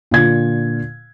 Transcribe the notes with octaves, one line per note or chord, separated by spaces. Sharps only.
A#2 D3 G#6